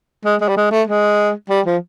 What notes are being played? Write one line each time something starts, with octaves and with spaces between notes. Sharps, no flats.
G#3
G#3
G3
G#3
A3
G#3
G3
F3